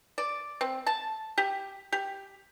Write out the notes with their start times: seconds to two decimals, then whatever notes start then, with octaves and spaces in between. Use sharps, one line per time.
0.18 D5
0.61 C4
0.86 A5
1.38 G4
1.92 G4